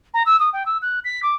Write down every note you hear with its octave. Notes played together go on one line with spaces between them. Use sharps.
A#5
E6
D#6
G5
E6
F#6
B6
D6